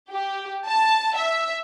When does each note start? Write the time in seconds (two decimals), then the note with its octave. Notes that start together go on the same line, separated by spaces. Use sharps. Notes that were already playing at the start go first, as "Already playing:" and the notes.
0.11 G4
0.67 A5
1.16 E5